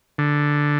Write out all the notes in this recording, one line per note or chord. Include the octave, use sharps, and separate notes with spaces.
D3